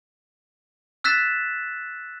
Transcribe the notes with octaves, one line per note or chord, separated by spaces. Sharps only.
E6 F#6 A6 B6 E7